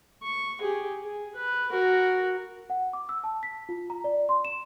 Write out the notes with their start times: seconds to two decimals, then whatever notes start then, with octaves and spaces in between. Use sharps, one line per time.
0.23 C#6
0.61 G4 G#4
1.03 G#4
1.35 B4
1.71 F#4 A#4
2.70 F#5
2.93 D6
3.09 E6
3.24 A5
3.43 B6
3.69 F4
3.90 A#5
4.04 D5
4.29 C6
4.45 E7